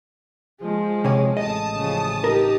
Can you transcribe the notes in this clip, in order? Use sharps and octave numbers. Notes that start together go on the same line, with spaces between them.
F3 G#3
C3 C#5
A1 D#5 A5 D#6
C#3 F3
D#4 G4 A#4